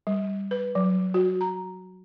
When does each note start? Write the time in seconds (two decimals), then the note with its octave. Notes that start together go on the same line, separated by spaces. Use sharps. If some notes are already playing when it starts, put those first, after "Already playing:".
0.07 G3
0.51 B4
0.75 F#3
1.14 F#4
1.41 A#5